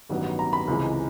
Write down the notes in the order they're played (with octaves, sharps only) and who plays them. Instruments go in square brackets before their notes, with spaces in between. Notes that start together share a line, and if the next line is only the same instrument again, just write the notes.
[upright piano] A1 G2 D#3 F#3 B3
[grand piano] A#5
B5
[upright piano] C#2 C3 E3 G#3